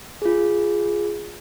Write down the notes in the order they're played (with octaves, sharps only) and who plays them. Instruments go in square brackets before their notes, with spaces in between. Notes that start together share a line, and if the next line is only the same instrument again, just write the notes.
[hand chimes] F4 G#4